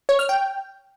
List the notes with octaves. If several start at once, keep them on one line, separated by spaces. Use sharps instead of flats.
C#5
F6
G5